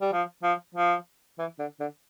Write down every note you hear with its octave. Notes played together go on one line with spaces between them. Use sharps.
G3
F3
F3
F3
E3
D3
D3